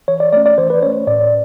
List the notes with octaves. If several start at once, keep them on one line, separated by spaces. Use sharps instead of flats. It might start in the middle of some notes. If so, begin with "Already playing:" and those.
E3 C#5
D5
A3 C#4 D5
D5
E3 C5
B4
A3 C#4 C#5
A2 D5